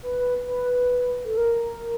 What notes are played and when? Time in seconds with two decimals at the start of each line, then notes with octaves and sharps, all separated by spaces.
0.03 B4
0.48 B4
1.25 A4
1.37 A#4